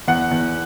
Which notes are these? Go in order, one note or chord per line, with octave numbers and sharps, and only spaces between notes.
E2 F#5
E2